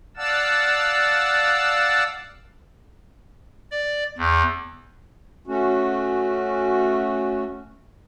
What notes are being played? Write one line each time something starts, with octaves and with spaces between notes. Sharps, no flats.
D5 F5 F#5 A5 E6
D5
E2
A3 C#4 F#4